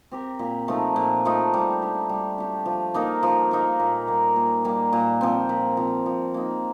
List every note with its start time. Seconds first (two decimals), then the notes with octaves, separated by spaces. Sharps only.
0.11 C4 G4 A#4
0.39 A#2
0.68 F3 A3 D#4
0.96 A#2
1.25 F3 A3 D#4
1.54 G3
1.82 D4 G4
2.09 G3
2.38 D4 G4
2.66 F3
2.94 A#3 D#4 A#4
3.23 F3
3.51 A#3 D#4 A#4
3.79 A#2
4.07 G3 A#3
4.36 A#2
4.65 G3 A#3
4.93 A#2
5.21 F3 C4
5.49 A#2
5.77 F3 C4
6.06 F3
6.34 A#3 D#4